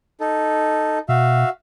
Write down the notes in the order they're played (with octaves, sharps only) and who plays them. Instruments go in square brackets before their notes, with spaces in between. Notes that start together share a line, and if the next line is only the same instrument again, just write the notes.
[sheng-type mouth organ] D#4 A4
[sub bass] B2 [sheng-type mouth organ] F#4 E5 F5